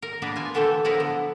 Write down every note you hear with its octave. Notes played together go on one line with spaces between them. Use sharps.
A#4
A#3 B3 D4 A#4 B4
F4 G#5
A#2 D3 E3 A3 G4 A4
F3 F#3 B3 E4 A#4 B4
D3